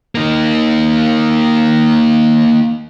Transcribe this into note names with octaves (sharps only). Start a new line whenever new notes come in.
A#3 D#4